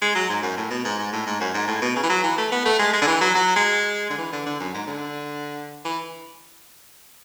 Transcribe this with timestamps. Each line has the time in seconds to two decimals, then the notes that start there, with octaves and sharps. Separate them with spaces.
0.01 G#3
0.15 F#3
0.29 G#2
0.43 F#2
0.57 A2
0.70 B2
0.85 G#2
0.98 G#2
1.13 A2
1.26 G#2
1.40 F#2
1.54 G#2
1.68 A2
1.82 B2
1.96 C#3
2.03 E3
2.09 F#3
2.23 E3
2.38 A3
2.52 B3
2.65 A3
2.79 G#3
2.93 G#3
3.02 D3
3.07 E3
3.21 F#3
3.35 F#3
3.56 G#3
4.10 D3
4.18 E3
4.32 D3
4.46 D3
4.60 F#2
4.74 G#2
4.87 D3
5.85 E3